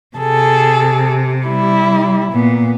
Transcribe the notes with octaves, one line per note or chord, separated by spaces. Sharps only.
C3 G#4 A4
G3 E4
A#2 B3